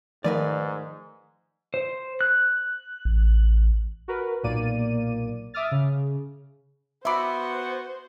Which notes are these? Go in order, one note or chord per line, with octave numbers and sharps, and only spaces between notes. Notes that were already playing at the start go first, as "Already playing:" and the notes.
G#2 D#3 F3 A3 A#4 B4 D5
C5
F#6
A1
F#4 A#4 B4
B1 A#2 A#3 D5 D#7
E5 D6 D#6 F6 A6
C#3
B3 F#4 C5 E5 B5 C6 D6